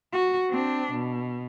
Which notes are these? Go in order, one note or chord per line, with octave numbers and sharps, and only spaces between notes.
F#4
C4 D4
B2